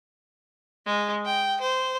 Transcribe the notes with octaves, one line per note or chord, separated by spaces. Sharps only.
G#3
G5
C5